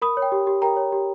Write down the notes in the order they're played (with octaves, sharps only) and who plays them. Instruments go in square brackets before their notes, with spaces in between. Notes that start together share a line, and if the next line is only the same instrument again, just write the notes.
[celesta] A#4 B5 D#6
C#5
G5
G4
G4
A#4 G5 A#5
C#5
G4